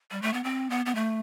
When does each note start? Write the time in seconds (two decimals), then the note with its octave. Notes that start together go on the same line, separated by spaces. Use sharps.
0.11 G3
0.22 A3
0.33 B3
0.44 C4
0.70 B3
0.86 B3
0.95 A3